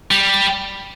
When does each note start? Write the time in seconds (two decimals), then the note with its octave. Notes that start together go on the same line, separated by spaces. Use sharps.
0.11 G3